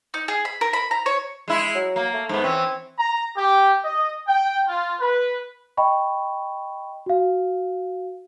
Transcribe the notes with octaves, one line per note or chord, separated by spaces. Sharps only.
D#4
G#4
B5
A#4
B5
A#5
C#5
G#3 E4
F#3
A#3
A3
G#2 B3
E3 C4 C#4
A#5
G4
D#5
G5
F4
B4
D#5 G5 B5 C#6
F#4 F5